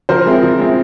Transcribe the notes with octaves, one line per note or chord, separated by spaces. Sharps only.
F3 A#4 C5
G#3 C4 E4
F3
G#3 C4 E4